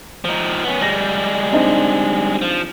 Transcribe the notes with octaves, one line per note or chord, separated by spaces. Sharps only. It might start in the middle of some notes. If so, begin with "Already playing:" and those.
F3 D#4
B3 C#4
G3 G#3 A#6 F#7
C4 D4 D#4
F3